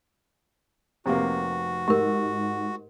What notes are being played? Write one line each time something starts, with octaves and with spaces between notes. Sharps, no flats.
F1 C3 A#3 F#4
G#2 G4 A#4